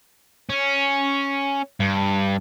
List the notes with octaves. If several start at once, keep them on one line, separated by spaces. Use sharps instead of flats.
C#4
G2